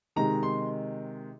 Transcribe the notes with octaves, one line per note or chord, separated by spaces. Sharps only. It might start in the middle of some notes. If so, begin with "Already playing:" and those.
C3 D#3 G#3 A#5
C6